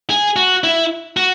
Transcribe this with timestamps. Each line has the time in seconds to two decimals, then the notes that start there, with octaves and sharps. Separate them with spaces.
0.10 G#4
0.36 F#4
0.64 E4
1.17 F#4